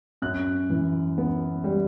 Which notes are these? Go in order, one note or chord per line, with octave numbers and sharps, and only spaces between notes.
F#2 F#6
E3
B3
G3